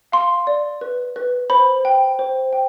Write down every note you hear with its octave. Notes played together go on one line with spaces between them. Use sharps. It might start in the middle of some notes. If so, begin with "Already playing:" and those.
F5 C6
D5
B4
B4
C5 B5
G5
C5
G5